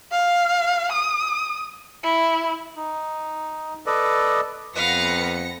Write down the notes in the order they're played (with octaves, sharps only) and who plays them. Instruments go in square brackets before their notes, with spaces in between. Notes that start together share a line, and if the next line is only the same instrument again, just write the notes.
[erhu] F5
D#6
E4
[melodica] D#4
A4 B4 D5 D#5
[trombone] F2 [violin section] B3 A#6 C#7 [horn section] B4 [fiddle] F5